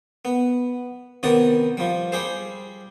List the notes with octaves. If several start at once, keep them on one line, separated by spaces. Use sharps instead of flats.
B3
C3 D#3 B3 D5 D#6
F3 G3
G3 G4 G#4 C5